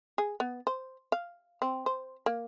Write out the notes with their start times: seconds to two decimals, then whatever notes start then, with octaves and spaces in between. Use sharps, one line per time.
0.18 G#4
0.40 B3
0.67 C5
1.12 F5
1.62 C4
1.86 C5
2.26 A#3